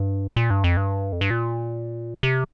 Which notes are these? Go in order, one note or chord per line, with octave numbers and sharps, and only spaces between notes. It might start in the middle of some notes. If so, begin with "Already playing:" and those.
Already playing: G2
A#2
G2
F2
G2
F2
G2
A#2
C3